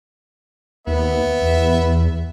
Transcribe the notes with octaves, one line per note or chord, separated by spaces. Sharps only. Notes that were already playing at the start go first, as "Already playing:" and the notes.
D#2 B3 E5
E2